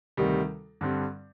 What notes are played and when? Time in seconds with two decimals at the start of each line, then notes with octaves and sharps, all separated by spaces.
0.17 D2 C3 D#3 G3
0.81 G2 D3 G3 C4